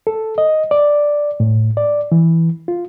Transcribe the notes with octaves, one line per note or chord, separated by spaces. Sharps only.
A4
D#5
D5
A2
D5
E3
F4